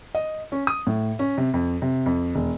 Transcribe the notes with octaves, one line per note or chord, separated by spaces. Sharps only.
D#5
C#4
D#6
A2
C#4
C3
F2
C3
F2
E1